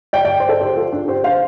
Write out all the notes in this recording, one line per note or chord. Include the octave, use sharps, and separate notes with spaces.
D5 G5
D5 G5
C5
A4 D5
G4 C5
F4 A4
D4
G4 C5
C5 F5